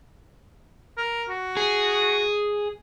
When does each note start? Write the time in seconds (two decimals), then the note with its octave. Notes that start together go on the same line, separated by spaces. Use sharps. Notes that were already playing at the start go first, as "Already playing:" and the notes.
0.97 A#4
1.29 F#4
1.57 G#4